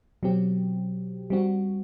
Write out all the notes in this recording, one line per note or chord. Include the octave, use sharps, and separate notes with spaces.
B2 F#3 C4 G4
G3 C4 F#4